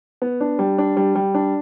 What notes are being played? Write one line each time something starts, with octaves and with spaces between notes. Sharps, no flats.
B3
D4
G3
D4
G3
G3
D4